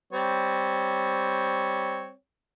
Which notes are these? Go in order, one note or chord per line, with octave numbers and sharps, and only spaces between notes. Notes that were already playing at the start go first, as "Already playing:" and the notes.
G3 C4 C#5